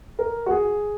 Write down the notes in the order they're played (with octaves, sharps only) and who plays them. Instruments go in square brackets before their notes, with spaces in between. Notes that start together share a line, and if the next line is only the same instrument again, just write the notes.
[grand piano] A#4
F#4
G#4